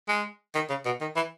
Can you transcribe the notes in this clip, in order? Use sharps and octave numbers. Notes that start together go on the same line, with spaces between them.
G#3
D#3
C#3
B2
D#3
E3